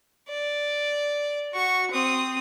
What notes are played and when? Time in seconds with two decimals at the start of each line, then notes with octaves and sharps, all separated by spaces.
0.29 D5
1.54 F#4 C#6
1.91 C4 D#6